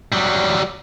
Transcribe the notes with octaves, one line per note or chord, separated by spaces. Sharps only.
F#3 G3